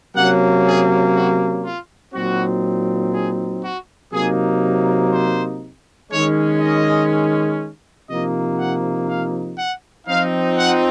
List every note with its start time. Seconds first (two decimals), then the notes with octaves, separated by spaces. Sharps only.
0.15 C3 F#3 A#3 C#4 F#5
0.65 G#4
1.14 F#4
1.64 F4
2.13 A#2 F#3 C4 D#4 F#4
3.13 G#4
3.62 F#4
4.12 C3 F#3 A#3 D#4 G#4
5.11 C5
6.10 D#3 G#3 C#4 C#5
6.60 D#5
8.08 C3 F3 A#3 D#4 D#5
8.58 F#5
9.08 F5
9.57 F#5
10.07 F3 C4 D#4 F5
10.56 F#5